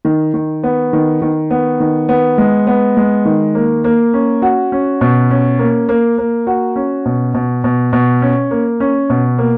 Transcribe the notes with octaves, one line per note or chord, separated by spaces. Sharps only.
D#3
D#3
B3
D#3
D#3
B3
D#3
B3
G#3
B3
G#3
D#3
A#3
A#3
C#4
F#4
C#4
B2
C#4
A#3
A#3
A#3
F#4
C#4
B2
B2
B2
B2
C#4
A#3
C#4
B2
A#3